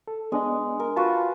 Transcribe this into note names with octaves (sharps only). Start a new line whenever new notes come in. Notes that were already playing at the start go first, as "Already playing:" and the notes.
A4
G#3 B3 D4 D#5
A#4
F4 F#4 B4 A5